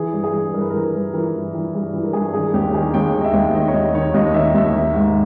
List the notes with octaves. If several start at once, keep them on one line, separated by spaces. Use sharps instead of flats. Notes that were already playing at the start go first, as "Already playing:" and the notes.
Already playing: E3 G#4
G2
G#4
E3
G2 A#4
B4
E3 A#4
B4
G2
E3 A#4
G2
E3
G2 G#4
E3
A#4
G2 G#4
D#3 G#4
D#2 G4
D#3 G#4
D#2 G5
D#3
D#5
E5
D#2
D#3 D#5
C#5
D#2 D#5
D#3 C#5
D#2 D#5
D#3 E5
D#2 E5
D#3
G#2